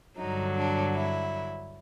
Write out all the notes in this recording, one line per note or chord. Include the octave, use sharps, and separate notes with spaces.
G2 D3 F#3 D#4
D4
E4